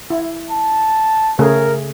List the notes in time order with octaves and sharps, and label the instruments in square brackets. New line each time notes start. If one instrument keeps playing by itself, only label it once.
[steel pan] E4
[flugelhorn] A5
[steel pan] C#3 A3 G#4 [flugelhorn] A#4